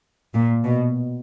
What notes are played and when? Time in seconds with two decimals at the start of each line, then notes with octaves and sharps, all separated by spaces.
0.35 A#2
0.64 B2